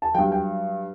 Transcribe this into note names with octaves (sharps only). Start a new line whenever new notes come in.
A5
G2 F#3 G5
G5